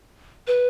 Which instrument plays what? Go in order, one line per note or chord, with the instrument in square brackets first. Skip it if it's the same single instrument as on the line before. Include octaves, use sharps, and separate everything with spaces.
[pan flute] B4